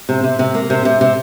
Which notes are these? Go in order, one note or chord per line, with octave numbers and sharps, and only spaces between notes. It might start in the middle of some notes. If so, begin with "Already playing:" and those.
C3
C3
C3
A#3
C3
C3
C3